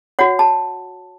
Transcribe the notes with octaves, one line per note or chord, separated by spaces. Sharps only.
F#4 C#5 F#5
A5